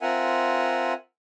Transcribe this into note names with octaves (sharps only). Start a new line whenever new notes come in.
C4 F4 A#4 E5 F#5 G#5